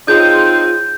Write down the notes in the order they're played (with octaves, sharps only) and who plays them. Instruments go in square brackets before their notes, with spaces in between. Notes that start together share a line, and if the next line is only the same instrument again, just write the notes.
[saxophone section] C4 D#4 [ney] F4 [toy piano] G#4 C#5 C6 [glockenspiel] G6